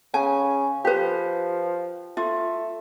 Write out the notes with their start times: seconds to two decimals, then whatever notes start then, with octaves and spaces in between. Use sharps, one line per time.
0.14 C#3 G#5
0.85 F3 G4 B4
2.17 A3 F4